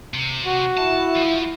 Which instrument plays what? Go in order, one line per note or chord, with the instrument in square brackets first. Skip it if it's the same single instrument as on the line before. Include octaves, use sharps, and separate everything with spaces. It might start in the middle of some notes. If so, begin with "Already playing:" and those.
[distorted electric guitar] C3
[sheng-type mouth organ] F#4
[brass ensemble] E4 [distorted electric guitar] A5
[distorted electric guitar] F3